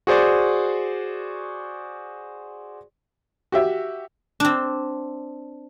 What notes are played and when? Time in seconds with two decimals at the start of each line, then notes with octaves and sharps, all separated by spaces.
0.07 F#4 G#4 C5 D5 C#6
3.52 F#4 G4 E5
4.40 C4 D4